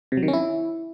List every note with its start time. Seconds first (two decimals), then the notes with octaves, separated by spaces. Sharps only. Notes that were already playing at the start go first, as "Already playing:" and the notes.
0.12 C3
0.17 F#3
0.23 D#3
0.28 C#4
0.33 E4